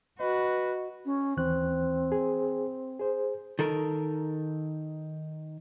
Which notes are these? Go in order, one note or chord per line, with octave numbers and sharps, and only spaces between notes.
F#4 B4 D#5
C#4
D#2 E3 C4 F#6
G#4
G#4 C5
D#3 A4 A#4